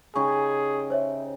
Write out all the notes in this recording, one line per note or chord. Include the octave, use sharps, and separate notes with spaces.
C#3 D#4 G4 G#4 C#6
C5 C#5 E5